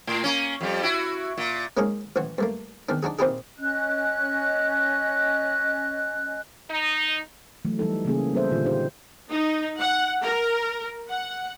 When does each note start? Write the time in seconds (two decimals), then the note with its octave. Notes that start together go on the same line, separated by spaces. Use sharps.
0.07 A2
0.24 A#3 C#4
0.61 F2 G3
0.83 E4 F#4
1.38 A#2
1.77 G#3 A#3 C#4 D#4 G#4 A#4
2.16 A1 E3 F#4
2.38 G2 A3 A#3
2.89 E2 D#3 D4
3.03 D4 D#4 F#4 G#4
3.19 A#2 C4 D#4 E4 G4 G#4
3.58 C#4 D#5 F#6
6.70 D#4
7.65 E3 F#3 A3
7.79 E3 G3 D#4 A4
8.05 C#3 E3 G3 A#3 C#4 G#4
8.33 G3 B3 A4 C5 E5
8.51 A#2 D3 E3 F4
8.66 D#4 G4 C5
9.30 D#4
9.80 F#5
10.24 A#4
11.10 F#5